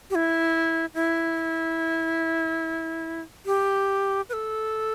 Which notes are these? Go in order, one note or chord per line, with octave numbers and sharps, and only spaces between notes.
G4
E4
E4
G4
B4
A4